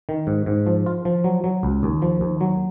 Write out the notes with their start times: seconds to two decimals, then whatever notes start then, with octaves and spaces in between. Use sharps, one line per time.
0.09 D#3
0.27 G#2
0.46 G#2
0.66 F3
0.86 F4
1.05 F3
1.24 F#3
1.44 F#3
1.63 C#2
1.83 D#2
2.02 F3
2.21 D#2
2.41 F#3